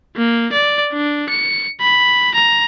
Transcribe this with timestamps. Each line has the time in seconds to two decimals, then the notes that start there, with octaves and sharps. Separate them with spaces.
0.17 A#3
0.53 D5
0.93 D4
1.30 C#7
1.81 B5
2.35 A#5